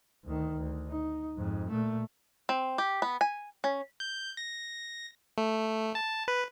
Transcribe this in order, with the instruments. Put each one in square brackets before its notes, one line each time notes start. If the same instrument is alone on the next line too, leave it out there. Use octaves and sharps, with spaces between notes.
[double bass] D2 D#3
D2
D#4
F2 G#2
A#2 A3
[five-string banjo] C4
G4
B3
G#5
C#4
[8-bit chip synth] G6
A#6
A3
A5
B4